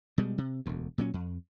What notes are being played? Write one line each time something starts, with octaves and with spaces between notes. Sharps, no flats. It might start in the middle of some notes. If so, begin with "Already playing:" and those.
B2 G3 G#3
C3
E1 D2
A#2 F#3 C#4
F2